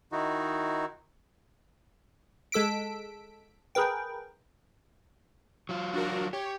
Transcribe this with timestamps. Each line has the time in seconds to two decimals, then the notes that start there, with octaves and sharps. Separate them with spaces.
0.12 D#3 D#4 E4 F#4
2.52 G#3 A4 E6 B6 D7
3.75 G#4 A#4 B4 G5
5.69 F#3 F4
5.94 D4 F#4 A#4
6.33 G4 C#5